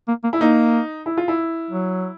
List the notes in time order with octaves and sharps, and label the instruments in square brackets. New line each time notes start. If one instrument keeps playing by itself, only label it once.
[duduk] A#3
A#3
[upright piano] E4
[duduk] A#3 [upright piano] D#4
[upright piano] E4
F4
E4
[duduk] F#3